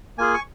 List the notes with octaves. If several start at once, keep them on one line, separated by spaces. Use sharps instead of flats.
A#3 F4 G#4 G#5
C#6